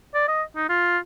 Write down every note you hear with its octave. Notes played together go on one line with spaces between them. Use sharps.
D5
D#5
D#4
F4